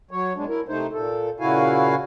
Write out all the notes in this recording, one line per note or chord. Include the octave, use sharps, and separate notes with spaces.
F#3 C#5
B2 G#3 D4
E4 A#4
C3 A3 D#4 C5
A#2 A4
A#2 C#3 E4 F#4 F5 G#5